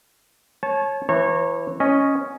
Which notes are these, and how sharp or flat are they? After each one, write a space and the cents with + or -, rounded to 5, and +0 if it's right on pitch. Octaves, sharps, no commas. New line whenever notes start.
C#5 -20 A5 -35
E3 +10 C#5 -30 A#5 -30
C#4 +0 D#5 +0